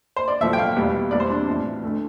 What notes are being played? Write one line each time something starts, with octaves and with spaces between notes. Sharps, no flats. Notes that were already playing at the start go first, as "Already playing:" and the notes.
C5
D5
B1 A2 F3 A3 E5
G5
F5
E2 B2 G3
E2 B2 G3 D5
C5
D4
C4
A1 A2 F3
D2 D3 A3